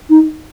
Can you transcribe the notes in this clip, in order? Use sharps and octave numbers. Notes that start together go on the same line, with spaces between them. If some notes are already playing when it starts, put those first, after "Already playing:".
D#4